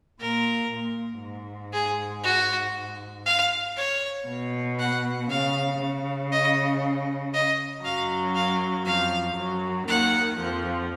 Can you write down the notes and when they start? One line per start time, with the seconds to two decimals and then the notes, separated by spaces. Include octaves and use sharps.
0.20 A#2 A#4
0.72 A#2
1.22 G#2
1.73 G#4
2.24 F#4
3.26 F5
3.77 C#5
4.28 B2
4.79 F#5
5.29 C#3 F5
5.80 C#3
6.32 D#5
7.34 D#5
7.84 F#2 F#3 F5
8.35 F5
8.86 F2 F3 F5
9.37 F#2 F#3
9.87 D#2 D#3 F#5
10.38 F2 F3